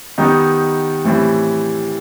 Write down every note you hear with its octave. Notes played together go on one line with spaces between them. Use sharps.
D#3 G3 B3 D#4
A2 E3 G3 C4